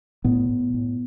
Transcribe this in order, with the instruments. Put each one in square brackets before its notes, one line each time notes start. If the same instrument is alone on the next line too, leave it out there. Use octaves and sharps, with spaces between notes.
[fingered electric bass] A2 B3
A2
A2